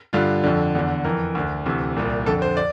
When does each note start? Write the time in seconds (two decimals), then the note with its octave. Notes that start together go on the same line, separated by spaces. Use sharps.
0.13 G2 D3 F4
0.44 F2 D3
0.75 E2 D3
1.04 F2 E3 A#4
1.35 D2 D3
1.66 D2 C3 E3
1.97 C2 A#2
2.26 F2 D3 A4
2.42 C5
2.57 D5